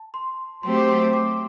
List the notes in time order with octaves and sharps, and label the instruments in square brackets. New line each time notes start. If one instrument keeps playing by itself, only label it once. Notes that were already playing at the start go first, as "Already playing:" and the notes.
Already playing: [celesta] A5
C6
[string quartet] F#3 A3 C4 G4 C5 [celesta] C6
[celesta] D6
C6
D6